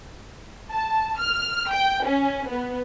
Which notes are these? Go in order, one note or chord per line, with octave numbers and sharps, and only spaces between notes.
A5
F6
G5
C#4
B3